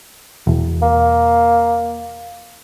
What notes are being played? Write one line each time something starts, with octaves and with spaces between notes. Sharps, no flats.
E1
A#3